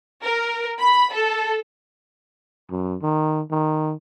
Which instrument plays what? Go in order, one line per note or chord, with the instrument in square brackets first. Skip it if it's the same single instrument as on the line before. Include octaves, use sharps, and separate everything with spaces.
[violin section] A#4
B5
A4
[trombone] F#2
D#3
D#3